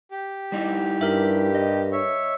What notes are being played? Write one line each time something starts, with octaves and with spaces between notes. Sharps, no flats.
G4
G3 D#4 E4
G2 A#4 E5
D#5
C#5 E5